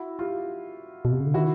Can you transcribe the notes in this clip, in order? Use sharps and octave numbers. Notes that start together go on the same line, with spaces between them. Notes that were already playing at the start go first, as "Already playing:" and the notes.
Already playing: E4 F#4
F4 G4
B2
C3
C#3
D3
D#3 E4 F#4